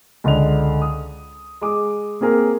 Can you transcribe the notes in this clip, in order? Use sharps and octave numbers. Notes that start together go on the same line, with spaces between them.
C#2 D3 D#5 F7
D#6
G#3 D6 D#6
A#3 C4 G#4 A#4